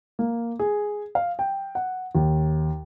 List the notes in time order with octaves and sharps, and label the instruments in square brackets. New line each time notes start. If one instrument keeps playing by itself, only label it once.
[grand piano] A#3
G#4
F5
G5
F#5
D#2